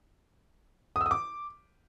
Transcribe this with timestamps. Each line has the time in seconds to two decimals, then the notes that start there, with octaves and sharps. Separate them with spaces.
0.96 D#6
1.01 E6
1.06 D#6
1.11 D6